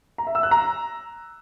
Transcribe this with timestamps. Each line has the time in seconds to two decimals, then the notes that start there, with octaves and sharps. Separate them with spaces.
0.18 A#5
0.27 E5
0.35 E6
0.43 F#6
0.51 A#5